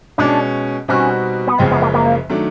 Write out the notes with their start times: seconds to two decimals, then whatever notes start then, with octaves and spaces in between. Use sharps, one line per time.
0.18 B2 G#3 C#4 D4
0.88 B2 G3 C4 C#4 D#4 F#4
1.47 B3
1.58 F#1 F#2 C#3 F3 G#3 C4
1.71 B3
1.82 A#3
1.94 A#3
2.29 D#3 F#3 A3 D4